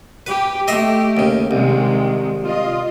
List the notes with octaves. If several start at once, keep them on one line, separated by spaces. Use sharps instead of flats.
G4 B4
A3 G4 D#5 E5 C6
D#2 C#3
C2 C3 D#3 G#3
F4 D#5